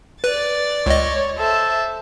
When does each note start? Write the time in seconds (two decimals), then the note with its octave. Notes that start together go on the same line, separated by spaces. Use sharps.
0.24 B4 D5 A6
0.86 C#2 C#5 D#5
1.38 A4 C5 E5